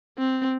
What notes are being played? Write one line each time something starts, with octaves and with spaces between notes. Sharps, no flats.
C4